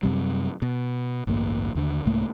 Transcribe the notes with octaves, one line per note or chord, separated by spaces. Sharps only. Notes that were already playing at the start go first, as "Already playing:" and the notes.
F#2 C3 G3
B2
A1 D2 G2 A#3
D#2 D3
C2 G#2 A3 A#3